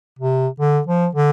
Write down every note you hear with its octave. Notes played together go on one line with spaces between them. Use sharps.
C3
D3
F3
D3